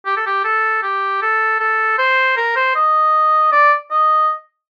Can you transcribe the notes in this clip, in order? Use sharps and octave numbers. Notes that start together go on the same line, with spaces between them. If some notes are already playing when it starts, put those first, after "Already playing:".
G4
A4
G4
A4
G4
A4
A4
C5
A#4
C5
D#5
D5
D#5